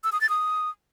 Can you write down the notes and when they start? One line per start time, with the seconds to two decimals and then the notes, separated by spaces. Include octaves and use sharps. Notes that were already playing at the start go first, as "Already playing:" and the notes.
0.04 E6
0.12 D#6
0.21 A6
0.29 D#6